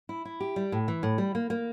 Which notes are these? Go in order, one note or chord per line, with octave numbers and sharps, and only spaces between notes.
E4
E4
G4
G3
A2
E3
A2
G3
A#3
A#3